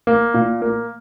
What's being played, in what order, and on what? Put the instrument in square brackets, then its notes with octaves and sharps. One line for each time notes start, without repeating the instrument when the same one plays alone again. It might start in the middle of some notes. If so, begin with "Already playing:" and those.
[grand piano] A#3
A#2
A#3